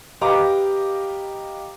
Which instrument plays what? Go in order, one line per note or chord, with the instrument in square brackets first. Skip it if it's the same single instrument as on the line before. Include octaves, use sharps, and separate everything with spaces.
[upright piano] G4 B4 D#5 F5 A#5 D6